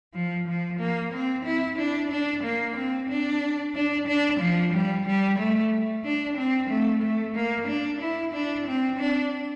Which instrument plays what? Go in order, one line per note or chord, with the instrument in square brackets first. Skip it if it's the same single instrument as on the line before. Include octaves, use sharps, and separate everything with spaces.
[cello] F3
F3
A#3
C4
E4
D4
D4
A#3
C4
D4
D4
D4
F3
G3
G3
A3
D4
C4
A3
A3
A#3
D4
E4
D4
C4
D4